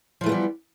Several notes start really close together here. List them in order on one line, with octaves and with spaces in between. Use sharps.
F3 E3 A3 B3 G3